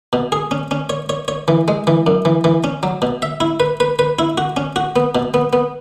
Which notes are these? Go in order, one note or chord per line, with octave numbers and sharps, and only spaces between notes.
B2
G#4
C#4
C#4
C#5
C#5
C#5
E3
G#3
E3
F#2
E3
E3
C#4
F#3
B2
E5
E4
B4
B4
B4
E4
F#4
C#4
F#4
B3
B2
B3
B3